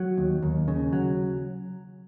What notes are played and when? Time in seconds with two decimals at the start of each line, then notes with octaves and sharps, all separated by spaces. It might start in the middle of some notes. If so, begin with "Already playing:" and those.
Already playing: F#3
0.18 D#2
0.43 D#2
0.68 C#3
0.93 F#3